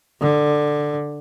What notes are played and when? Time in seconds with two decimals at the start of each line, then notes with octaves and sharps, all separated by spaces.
0.21 D3